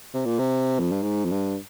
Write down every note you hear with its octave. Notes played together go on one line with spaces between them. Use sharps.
C3
A#2
C3
F2
G2
G#2
F2
G2